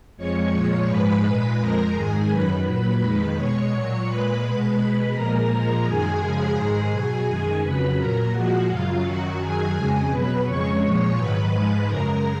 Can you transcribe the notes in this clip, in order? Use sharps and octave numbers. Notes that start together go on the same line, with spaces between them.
F2 F3 G#3 C#5 C#6
A#2 F3 G#3
G#2 F3 G#3 B4 B5
A#2 G#3
F2 F3 G#3 A#4 A#5
G#2 D#3 G#3 G#4 G#5
F#2 D#3 F#3 B4 B5
A#2 F#3
F2 D#3 G#3 B4 B5
B2 G#3 C#5 C#6
A#2 F#3 C#5 C#6
A#2 G#3 B4 B5
B2 G#3
B2 G#3 B4 B5
A#2 F3 G#3 A#4 A#5
A#2 F3 G#3
F#2 D#3 G#3 G#4 G#5
F#2 C#3 F3 G#3
G#2 D#3 G#3
B2 F#3 G#4 G#5
F#2 D#3 G#3
F2 C#3 F#3 B4 B5
A#2 F#3 A#4 A#5
A#2 F3 G#3 F#4 F#5
F#2 C#3 F#3 F4 F5
F#2 D#3 F#3 F#4 F#5
F#2 D#3 F#3 G#4 G#5
F2 C#3 G#3
B2 F#3 B4 B5
F2 C#3 G#3 C#5 C#6
A#2 F3 G#3
G#2 D#3 F#3 B4 B5
G#2 F3 G#3 B4 B5
F#2 C#3 G#3 A#4 A#5